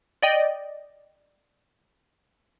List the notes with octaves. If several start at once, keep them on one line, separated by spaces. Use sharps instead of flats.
D5 D#5 G5